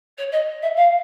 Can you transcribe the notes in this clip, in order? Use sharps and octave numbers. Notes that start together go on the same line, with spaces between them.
C#5
D#5
E5
F5